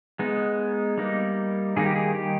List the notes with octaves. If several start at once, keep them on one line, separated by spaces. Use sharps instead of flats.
G#3 B3 D#4
G3 A#3 D#4
D#3 G3 A#3 D#4 G#4
G4
G#4
G4